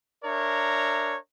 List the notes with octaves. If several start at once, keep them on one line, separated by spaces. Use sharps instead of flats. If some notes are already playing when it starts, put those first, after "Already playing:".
D4 A#4 C#5 E5 A#5